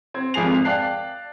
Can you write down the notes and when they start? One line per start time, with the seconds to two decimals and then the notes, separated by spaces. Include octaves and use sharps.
0.14 C4 G#6
0.34 G#1 F2 G#4 G#5 C7 F7
0.65 D5 F5 G5 A5 F#6 C7